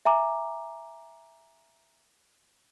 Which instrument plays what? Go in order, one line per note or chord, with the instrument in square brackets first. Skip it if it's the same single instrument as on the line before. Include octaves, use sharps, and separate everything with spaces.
[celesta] E5 G#5 A#5 D6